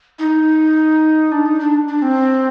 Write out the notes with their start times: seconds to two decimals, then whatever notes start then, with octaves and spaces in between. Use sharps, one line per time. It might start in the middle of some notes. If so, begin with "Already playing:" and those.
0.19 D#4
1.32 D4
1.46 D#4
1.60 D4
1.88 D4
2.02 C4